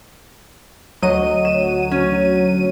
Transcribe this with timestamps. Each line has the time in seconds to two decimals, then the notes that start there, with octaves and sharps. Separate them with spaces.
1.02 D2 F#3 D#5 D#7
1.45 E7
1.91 C#4